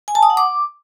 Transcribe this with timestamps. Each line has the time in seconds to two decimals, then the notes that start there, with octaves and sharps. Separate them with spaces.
0.08 G#5
0.15 A5
0.23 D#6
0.30 F#5
0.37 D6